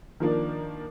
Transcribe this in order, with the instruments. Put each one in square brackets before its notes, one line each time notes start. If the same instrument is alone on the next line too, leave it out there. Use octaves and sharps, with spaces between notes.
[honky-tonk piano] D#3 F3 A#3 D4